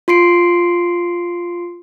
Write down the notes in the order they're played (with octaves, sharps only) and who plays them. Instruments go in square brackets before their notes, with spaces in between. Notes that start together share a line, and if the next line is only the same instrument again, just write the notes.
[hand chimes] F4 C6 C7 D7